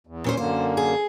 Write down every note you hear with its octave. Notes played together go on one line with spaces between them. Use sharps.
E2
A#2 C#4 C5
F#2 D3 A#3 C5
G#4